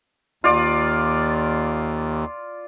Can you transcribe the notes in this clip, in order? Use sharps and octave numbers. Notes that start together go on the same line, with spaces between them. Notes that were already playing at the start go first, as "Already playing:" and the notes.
D#2 F4 D5